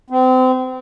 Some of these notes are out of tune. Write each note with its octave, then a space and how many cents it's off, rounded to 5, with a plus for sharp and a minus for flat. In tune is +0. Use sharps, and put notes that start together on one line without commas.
C4 -30